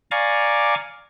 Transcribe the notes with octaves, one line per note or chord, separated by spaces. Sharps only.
D5 F5 G#5 A#5 C#6 D6